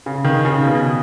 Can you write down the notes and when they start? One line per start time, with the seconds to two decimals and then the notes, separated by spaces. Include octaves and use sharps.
0.06 C#3
0.25 D#3
0.45 C#3
0.64 B2